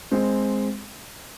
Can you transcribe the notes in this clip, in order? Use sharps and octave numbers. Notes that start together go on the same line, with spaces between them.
G#3 C4